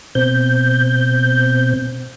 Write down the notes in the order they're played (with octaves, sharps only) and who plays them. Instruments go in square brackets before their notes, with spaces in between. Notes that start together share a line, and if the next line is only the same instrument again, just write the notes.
[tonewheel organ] B2 C4 G6